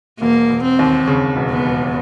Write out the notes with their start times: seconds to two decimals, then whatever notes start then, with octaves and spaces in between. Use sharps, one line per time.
0.20 E1 A#3
0.50 E1
0.63 C4
0.79 D#2
1.07 C#3
1.36 E1
1.50 B3
1.65 E1